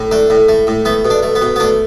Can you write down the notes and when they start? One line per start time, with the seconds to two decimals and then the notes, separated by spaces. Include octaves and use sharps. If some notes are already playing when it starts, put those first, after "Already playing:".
Already playing: A2
0.11 A3 D4
0.30 A2
0.49 A3
0.67 A2
0.85 A3 B3
1.05 B2
1.10 D4
1.23 A3
1.35 B3
1.42 B2
1.56 B3
1.60 A3 D4